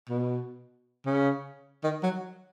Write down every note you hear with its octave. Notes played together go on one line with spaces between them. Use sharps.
B2
C#3
D#3
F#3